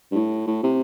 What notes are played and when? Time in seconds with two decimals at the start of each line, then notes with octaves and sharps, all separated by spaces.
0.11 G2
0.15 A2
0.47 A2
0.63 C3